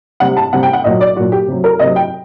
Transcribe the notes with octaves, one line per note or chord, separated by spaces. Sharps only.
C3 G3 F#5
A5
C3 G3 F#5
G5
F#5
A#2 F#3 D#5
D5
A#2 F#3 F#4
G4
C3 F#3
A#4
C3 F#3 D#5
G5